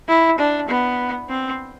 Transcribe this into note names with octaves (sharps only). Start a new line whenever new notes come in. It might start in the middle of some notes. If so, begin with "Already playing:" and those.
E4
D4
B3
C4